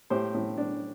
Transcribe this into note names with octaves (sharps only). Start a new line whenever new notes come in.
A2 G4 C5
A2
D4